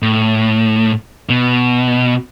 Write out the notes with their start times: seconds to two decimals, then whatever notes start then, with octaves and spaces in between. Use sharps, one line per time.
0.02 A2
1.29 B2